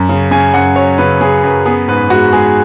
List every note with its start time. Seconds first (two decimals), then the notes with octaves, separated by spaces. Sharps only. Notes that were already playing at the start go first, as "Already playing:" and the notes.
Already playing: F#2
0.09 C#3
0.31 C#3 G#5
0.54 F#2 F#5
0.75 F#3 C#5
0.98 C#3 B4
1.21 C#3 G#4
1.44 F#2 B4
1.66 B3 G#4
1.88 G#2 B4
2.10 G#3 F#4
2.33 G#3 G#4